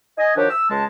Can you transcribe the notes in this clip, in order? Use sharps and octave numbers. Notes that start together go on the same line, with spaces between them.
D#5 G#5
D#3 F3 D4 F#4 G4 C#5
E6
C#2 G#3 A5